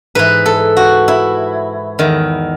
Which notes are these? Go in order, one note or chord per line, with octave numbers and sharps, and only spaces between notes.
G#2 E3 B4
A4
F#4
E4
E2 D#3